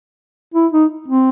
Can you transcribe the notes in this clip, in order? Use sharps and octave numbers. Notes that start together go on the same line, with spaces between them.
E4
D#4
C4